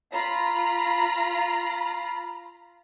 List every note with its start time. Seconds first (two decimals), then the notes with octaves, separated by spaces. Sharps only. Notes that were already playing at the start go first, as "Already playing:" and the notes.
0.13 F4 A#5 B5